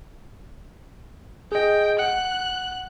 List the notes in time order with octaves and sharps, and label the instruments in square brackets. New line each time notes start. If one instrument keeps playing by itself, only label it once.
[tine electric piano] G#4 D#5 [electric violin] G5
[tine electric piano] F#5 [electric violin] F#6